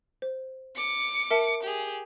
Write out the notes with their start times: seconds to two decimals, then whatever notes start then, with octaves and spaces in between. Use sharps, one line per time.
0.22 C5
0.76 D6 C#7
1.31 A#4 E5 A5
1.63 G4 G#4